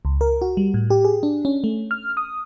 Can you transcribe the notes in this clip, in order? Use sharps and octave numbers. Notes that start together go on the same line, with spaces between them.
C#2
A#4
F#4
G3
A2
G4
G#4
D4
C#4
A3
F6
D#6